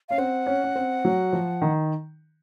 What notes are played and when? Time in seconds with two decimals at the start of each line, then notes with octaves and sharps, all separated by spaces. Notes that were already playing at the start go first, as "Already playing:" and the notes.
0.09 C#4 F5
0.18 C4 F#5
0.46 C#4
0.64 C#4
0.75 C4
1.05 F#3
1.33 F3
1.62 D#3